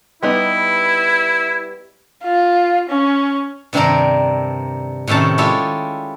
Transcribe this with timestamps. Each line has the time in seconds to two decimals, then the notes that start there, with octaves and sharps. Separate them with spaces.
0.23 G3 B3 D#4 E4
2.24 F4
2.90 C#4
3.73 G2 C3 D#3 C4 D4 A#4
5.08 A2 C3 D#3 C#4 A5
5.38 G#3 E4 F4 G4 A4 C#5